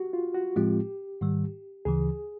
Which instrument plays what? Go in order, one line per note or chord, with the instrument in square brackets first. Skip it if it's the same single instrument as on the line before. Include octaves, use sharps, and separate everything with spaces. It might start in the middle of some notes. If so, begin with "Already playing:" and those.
Already playing: [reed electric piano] F#4 G4
F4
F#4
[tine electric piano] A2 F3 G#3 C4 F4 [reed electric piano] G4
[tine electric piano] G#2 D#3 G3
[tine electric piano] D2 C#3 E3 [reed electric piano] G#4